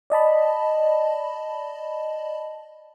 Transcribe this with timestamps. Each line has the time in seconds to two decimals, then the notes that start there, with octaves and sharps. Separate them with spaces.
0.10 D5 D#5 A5 B5